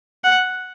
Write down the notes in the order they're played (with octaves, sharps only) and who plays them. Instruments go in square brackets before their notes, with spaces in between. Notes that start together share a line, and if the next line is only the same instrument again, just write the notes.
[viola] F#5